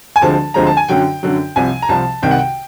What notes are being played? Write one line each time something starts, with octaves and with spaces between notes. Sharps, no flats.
G#5
D2 D3 F3 G#3 C4 A5
D2 D3 F3 G#3 C4 A#5
A5
G#5
F#2 D3 F#3 G5
F#2 D3 F#3
C2 C3 F3 G#5
A#5
C2 C3 F3 A5
C2 C3 D#3 G5
F#5
G5